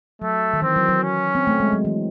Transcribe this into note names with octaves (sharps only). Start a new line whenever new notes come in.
F#3 A3
D#3
E3 C4
F#3
F#3
C#4
C4
A3
G#3
F#3
E3